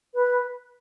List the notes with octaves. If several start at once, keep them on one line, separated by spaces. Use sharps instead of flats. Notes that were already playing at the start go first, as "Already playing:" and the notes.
B4